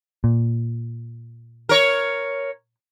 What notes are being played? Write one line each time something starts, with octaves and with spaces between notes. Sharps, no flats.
A#2
A#4 C#5